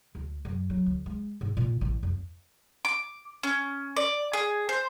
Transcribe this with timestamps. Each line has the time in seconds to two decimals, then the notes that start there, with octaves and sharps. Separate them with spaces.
0.15 D2
0.45 F#2
0.70 F#3
0.86 D2
1.06 G#3
1.41 G#2
1.57 A#2
1.81 A1
2.03 F2
2.85 D6
3.43 C#4
3.96 D5
4.33 G#4
4.69 C5